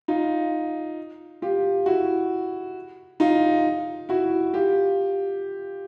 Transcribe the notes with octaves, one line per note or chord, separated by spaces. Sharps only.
D#4 F4
F4 G4
E4 F#4
D#4 F4
E4 F#4
F4 G4